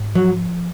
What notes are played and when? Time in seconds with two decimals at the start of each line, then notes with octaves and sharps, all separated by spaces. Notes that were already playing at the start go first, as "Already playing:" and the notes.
Already playing: G#2
0.15 F3 F#3